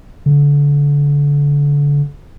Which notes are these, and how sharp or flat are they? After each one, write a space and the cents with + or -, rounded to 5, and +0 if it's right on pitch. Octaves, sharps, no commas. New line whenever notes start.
D3 -30